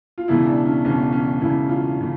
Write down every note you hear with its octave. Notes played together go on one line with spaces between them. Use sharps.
F4
E1 E2 C#3 E4
D4
C#4
E1 E2 C#3 C#4
C#4
E1 E2 C#3 E4
F4
C#3